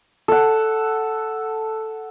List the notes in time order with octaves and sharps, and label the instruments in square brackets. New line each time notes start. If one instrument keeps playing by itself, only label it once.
[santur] A4 F#5